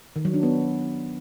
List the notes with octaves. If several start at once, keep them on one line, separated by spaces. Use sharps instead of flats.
D#3
F#3
D4
B3